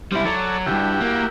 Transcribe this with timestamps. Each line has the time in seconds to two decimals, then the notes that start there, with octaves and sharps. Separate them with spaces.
0.12 G3 C4 E4
0.25 F#3 A4 C#5 D5
0.66 C#2 G2 E4 F#4 G4
1.00 A#3